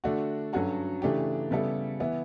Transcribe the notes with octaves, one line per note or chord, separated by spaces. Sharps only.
D3 A3 D4 F#4
G2 F#3 C#4 F#4 A4
C#3 E3 A3 D4 G4
C#3 G3 B3 E4 A4
E3 B3 E4